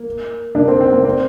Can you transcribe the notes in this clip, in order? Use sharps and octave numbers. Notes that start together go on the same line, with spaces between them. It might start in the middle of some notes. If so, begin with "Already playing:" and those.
Already playing: A#3
A#3 D4
C4
C4
A#3
C4